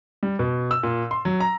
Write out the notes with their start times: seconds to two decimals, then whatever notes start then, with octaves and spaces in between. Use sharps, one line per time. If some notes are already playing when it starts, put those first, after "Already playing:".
0.23 G3
0.39 B2
0.71 E6
0.83 A#2
1.11 C6
1.25 F#3
1.40 A#5